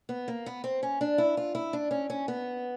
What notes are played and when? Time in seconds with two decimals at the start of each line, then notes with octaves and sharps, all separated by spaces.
0.09 B3
0.28 A#3
0.46 B3
0.64 C4
0.83 C#4
1.01 D4
1.18 E4
1.37 F4
1.55 E4
1.73 D4
1.91 C#4
2.10 C#4
2.28 B3